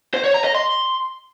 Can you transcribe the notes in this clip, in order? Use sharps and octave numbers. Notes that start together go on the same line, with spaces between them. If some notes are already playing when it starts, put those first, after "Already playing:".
C5
C#5
A#5
D#5
C6